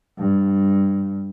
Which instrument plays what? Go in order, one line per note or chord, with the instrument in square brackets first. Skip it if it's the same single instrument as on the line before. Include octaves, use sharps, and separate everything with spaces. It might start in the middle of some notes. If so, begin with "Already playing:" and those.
[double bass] G2